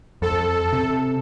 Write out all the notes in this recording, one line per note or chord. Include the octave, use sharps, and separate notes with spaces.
F2 A4
C3